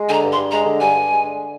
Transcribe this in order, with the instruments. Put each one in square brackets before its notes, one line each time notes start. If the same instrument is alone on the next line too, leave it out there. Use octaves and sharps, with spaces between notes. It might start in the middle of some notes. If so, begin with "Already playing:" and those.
Already playing: [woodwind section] G#3
[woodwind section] D3 [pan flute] G#5
[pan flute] A#5
[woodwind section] G2
[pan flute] C6
[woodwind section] G2
[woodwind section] G#3 [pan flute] A#5
[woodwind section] D3
[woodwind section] G2 [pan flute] G#5
[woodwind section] G2
G#3
D3